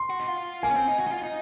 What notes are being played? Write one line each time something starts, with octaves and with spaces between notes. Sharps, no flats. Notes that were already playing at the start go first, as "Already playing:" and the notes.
Already playing: C6
F#4
D#4
F4
A#3 G#5
C#4
C4
D#4
F#4
D#4
F4
D#4